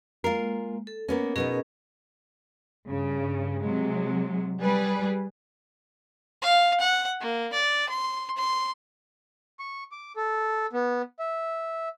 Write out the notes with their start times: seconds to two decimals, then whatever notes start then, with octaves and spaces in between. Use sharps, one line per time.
0.24 G#3 A#3 F4 A#4
0.87 A4
1.09 A#3 B3 C#4 A#4
1.36 B2 B3 C#4 D#4 G#4 A#4
2.87 G2 C#3
3.62 C3 F#3 G#3
4.61 G3 G#4 B4
6.42 F5
6.80 F#5
7.20 A#3
7.53 D5
7.89 C6
8.37 C6
9.59 C#6
9.92 D6
10.16 A4
10.73 B3
11.19 E5